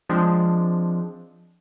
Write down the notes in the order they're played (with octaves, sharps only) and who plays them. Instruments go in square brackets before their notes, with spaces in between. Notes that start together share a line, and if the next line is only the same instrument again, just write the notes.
[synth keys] F3 G#3 C4 D4